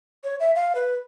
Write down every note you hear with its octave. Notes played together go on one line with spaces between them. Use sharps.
C#5
E5
F5
B4